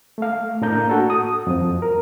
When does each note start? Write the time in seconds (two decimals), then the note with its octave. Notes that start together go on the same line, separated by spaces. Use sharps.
0.18 A3 F5
0.62 A2 A#3 D4 A#5 G6
0.89 F#4 A4
1.10 D#6
1.47 F2 F3
1.82 A#4